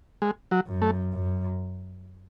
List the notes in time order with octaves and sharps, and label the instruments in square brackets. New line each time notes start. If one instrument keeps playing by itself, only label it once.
[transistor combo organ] G#3
F#3
[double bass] F#2
[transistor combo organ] A3
[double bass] F#2